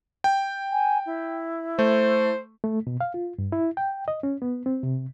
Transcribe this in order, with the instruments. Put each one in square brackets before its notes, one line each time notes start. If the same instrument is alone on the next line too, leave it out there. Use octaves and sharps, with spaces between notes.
[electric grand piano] G5
[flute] G#5
E4
[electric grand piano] A3 [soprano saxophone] C5
[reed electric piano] A3
B2
F5
F4
G2
E4
G5
D#5
C#4
B3
C4
C3